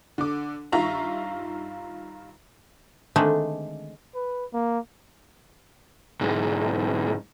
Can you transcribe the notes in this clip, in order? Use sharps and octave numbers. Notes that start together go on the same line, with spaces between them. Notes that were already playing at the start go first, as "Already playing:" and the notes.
D3 D6
G2 D#3 F4 E5 A#5 C#6
D3 D#3 G#3 A3 C4 D4
B4
A#3
B1 G#2